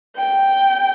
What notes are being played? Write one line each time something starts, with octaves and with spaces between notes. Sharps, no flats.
G5